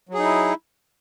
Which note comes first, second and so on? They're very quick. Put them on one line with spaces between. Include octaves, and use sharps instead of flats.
F#3 G#4 D#4 E4